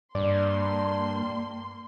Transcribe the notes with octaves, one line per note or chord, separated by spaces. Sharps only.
G2 A#3 D5 C6